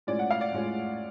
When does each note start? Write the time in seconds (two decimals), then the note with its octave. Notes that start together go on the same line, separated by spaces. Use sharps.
0.07 A2 G#3 C#4 F4 D5
0.19 F#5
0.30 F5
0.41 D5
0.53 A2 G#3 C#4 F4